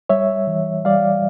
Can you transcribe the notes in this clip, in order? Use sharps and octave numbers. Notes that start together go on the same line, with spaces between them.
G3 C#5 E5
E3
G3 D5 F5